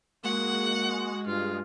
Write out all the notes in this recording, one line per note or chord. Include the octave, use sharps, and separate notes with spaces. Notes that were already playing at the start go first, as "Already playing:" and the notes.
G#3 A#3 F#4 F#5
G2 F4